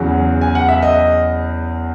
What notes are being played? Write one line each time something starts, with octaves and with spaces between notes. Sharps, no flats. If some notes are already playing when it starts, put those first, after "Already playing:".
Already playing: E2 C#3 F#3
G#5
F#5
E5
D#5